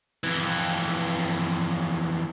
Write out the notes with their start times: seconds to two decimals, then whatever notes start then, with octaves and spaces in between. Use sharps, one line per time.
0.24 F2 E3